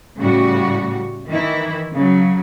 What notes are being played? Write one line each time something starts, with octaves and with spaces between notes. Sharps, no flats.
A2 C#3 G3 F#4
D#3 E3 E4
C#3 F#3